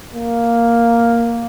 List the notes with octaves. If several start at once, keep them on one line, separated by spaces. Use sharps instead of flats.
A#3